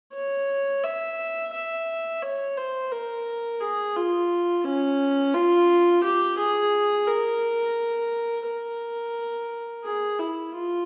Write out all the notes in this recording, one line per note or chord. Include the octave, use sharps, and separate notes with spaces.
C#5
E5
E5
C#5
C5
A#4
G#4
F4
C#4
F4
G4
G#4
A#4
A#4
G#4
E4
F4